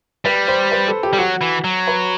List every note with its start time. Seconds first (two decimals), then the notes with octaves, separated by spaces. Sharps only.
0.25 G3 B4
0.48 C5
0.72 B4
0.88 A4
1.03 G4
1.13 G3
1.18 F#3 F#4
1.41 E3
1.64 F#3
1.87 B4